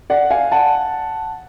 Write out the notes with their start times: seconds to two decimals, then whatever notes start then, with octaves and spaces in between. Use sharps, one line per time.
0.10 D5 F#5
0.30 F5 G#5
0.52 F#5 A5